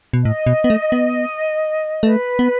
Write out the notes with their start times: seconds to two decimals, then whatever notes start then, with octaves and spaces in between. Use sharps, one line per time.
0.13 B2
0.24 A2 D#5
0.46 B2
0.64 B3
0.70 A3
0.92 B3
2.03 A3 B4
2.39 B3